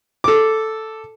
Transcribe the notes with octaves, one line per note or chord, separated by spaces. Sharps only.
A4 D6